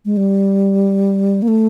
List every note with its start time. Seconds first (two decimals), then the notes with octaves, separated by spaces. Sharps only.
0.05 G#3
0.17 G3
1.42 A#3
1.48 A3